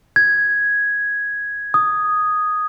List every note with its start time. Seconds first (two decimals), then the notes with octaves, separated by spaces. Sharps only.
0.16 G#6
1.74 D#6